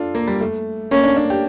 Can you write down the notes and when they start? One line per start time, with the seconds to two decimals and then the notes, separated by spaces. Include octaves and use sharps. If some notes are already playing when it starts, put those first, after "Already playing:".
Already playing: D4 F4 A4
0.15 A#3
0.28 G3
0.41 A3
0.91 A#3 C#4
1.04 D4
1.17 D4
1.30 G4